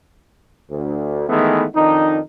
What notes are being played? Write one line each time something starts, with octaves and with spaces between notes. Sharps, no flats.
D2
D#3 E3 G#3 A3 B3
F2 D#3 D4 D#4